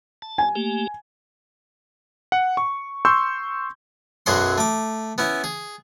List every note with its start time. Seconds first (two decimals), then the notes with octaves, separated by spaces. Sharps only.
0.22 A5
0.38 G#5
0.56 A3 A#3 G4
2.32 F#5
2.57 C#6
3.05 C6 C#6 E6 G6
4.26 B1 F#2 F#3 G#4 F#5 C6
4.58 A3 D6
5.18 B3 C#4 E4
5.44 G#4